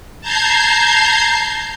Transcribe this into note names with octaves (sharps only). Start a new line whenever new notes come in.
A5 A#5 G6 G#6 C7